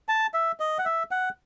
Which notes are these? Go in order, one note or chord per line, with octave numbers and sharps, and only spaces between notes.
A5
E5
D#5
F#5
E5
F#5